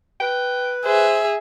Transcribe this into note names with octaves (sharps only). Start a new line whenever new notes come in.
B4 G5
G#4 C5 E5